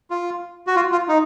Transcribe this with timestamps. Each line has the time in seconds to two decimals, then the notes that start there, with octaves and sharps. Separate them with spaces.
0.11 F4
0.67 F#4
0.76 F4
0.92 F4
1.08 D#4